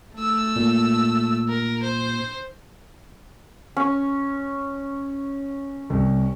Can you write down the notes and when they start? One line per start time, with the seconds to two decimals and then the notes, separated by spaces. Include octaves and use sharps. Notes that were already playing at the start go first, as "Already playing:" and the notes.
0.15 A3 E6
0.56 A#2
1.49 A#4
1.83 C5
3.77 C#4
5.90 C2